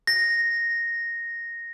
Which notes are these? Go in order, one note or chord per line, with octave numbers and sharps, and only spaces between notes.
A#6